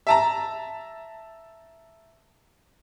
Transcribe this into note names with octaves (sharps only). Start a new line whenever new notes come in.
E5 A5 A#5